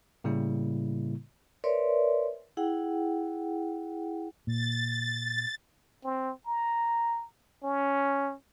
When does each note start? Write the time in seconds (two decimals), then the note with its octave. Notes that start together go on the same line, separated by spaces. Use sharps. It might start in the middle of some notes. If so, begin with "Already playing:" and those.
0.24 A2 C#3 G3 A#3 E4
1.64 A#4 B4 C#5 D5 E5 C6
2.57 E4 G#4 F#5 G5
4.47 A#2 A6
6.04 C4
6.46 A#5
7.63 C#4